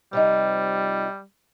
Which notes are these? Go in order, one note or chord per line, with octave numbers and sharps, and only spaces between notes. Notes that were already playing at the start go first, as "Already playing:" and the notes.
C3 F3 G3 D#4